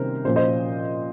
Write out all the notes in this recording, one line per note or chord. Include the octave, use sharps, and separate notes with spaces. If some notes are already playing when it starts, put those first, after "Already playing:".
Already playing: C3 D#3 G3 A#3 C#4 A#4 C5
A#2 F3 A#3 C#4 C5
C5 D#5